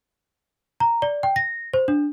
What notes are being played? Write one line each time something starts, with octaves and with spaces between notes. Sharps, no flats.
A#5
D5
G5
A#6
C5
D4